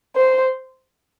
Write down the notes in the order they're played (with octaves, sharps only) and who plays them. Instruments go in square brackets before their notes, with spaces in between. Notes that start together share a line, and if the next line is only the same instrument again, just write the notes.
[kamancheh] C5